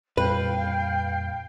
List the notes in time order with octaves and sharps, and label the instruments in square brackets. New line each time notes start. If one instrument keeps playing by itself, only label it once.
[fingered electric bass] F2 A#2 G3 [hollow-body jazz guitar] B4 [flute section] F5 G5